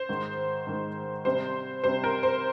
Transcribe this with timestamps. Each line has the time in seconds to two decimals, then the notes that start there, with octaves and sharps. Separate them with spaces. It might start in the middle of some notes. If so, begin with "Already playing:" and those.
Already playing: C5
0.09 G#2 D#3 G#3
0.67 G#2 D#3 G#3
1.25 C3 G3 C5
1.84 C3 G3 C5
2.04 A#4
2.23 C5